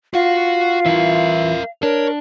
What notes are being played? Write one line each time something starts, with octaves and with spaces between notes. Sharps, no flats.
F4 F#4 F5 F#5
E3 E4 A#4 E5
D4 A#4 C#5